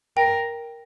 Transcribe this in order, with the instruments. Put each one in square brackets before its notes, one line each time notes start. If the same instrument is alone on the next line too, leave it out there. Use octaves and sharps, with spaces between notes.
[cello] A#4 [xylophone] G5